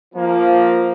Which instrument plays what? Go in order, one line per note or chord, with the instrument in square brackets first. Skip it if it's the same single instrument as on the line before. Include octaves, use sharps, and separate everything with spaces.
[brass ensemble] F3 A#3